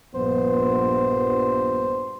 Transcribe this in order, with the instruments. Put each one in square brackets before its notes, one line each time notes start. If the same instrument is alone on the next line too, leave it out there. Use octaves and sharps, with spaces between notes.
[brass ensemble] A#1 G2 B3 [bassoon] C5